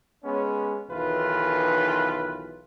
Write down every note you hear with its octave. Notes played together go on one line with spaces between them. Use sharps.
G#3 B3 C#4
B1 D#3 E3 F4 B4